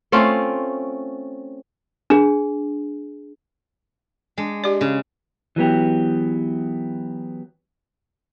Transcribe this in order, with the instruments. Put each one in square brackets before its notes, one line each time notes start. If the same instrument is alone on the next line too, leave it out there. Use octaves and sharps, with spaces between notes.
[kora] A3 C4 C#4 F4
[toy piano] D4 G#4
[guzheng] G#3 D4
[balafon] G4 D5
[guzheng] C#3
[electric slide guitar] E3 F#3 B3 G4